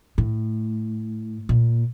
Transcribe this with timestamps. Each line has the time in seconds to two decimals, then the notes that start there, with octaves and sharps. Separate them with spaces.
0.18 A2
1.49 A#2